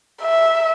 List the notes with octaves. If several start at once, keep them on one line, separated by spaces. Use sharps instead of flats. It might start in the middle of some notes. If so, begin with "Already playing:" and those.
E5